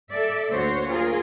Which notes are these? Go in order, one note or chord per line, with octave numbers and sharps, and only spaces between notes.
A4 D5 E5
D2 A#3 F#4 C5 C#5
F4 G#4 A#4